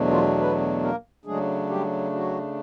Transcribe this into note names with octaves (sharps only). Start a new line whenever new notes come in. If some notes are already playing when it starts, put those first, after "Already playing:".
Already playing: E2 B2 F#3 A3 D4
F3 F4
B3 B4
A#3 A#4
C#3 F#3 G#3 A3 D4 G#4
G3 G4
F#3 F#4